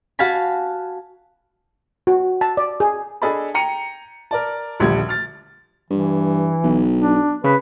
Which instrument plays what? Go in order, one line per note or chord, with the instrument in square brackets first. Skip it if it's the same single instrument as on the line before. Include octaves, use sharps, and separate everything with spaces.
[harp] F#4 F5 G#5 A5 B5
[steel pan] F#4
A5
D5
G#4
[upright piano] D4 G#4 A4 D#5 A5 B5
G5 A#5 C#7 D#7
A#4 D5 A5
D#1 A#1 D3 F3 G3 G#6
F6 A6
[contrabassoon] G2 [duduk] E3
[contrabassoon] B1
[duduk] D4
[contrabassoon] C#3 [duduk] B4